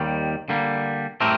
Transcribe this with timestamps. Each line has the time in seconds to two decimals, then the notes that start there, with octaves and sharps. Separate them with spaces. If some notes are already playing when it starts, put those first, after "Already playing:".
Already playing: D#2 D#3 G3
0.49 D3 G3 A#3
1.21 A2 A3 C4 G4 A#4